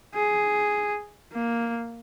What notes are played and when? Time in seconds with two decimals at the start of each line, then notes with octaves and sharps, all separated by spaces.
0.15 G#4
1.33 A#3